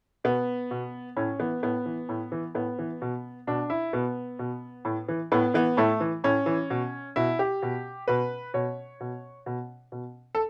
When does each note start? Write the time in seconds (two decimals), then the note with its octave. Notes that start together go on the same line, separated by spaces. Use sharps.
0.24 B2 B3
0.71 B2
1.17 A2 C#4
1.39 E3 B3
1.63 A2 B3
1.86 E3
2.09 A2
2.32 E3
2.55 A2 B3
2.79 E3
3.02 B2
3.47 B2 D4
3.70 E4
3.93 B2 B3
4.39 B2
4.85 A2
5.08 E3
5.32 A2 B3
5.54 E3 B3
5.77 A2 A3
6.00 E3
6.24 A2 C#4
6.46 E3
6.70 B2
7.16 B2 E4
7.39 G4
7.62 B2
8.08 B2 B4
8.54 B2 C#5
9.00 B2
9.46 B2
9.92 B2
10.35 A4